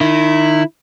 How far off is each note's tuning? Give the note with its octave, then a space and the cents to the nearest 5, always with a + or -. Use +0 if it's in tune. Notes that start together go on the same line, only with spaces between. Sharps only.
D#3 -25 E4 +0